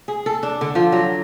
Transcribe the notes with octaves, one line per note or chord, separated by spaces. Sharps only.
G#4
A4
D4
D3
F3
F#3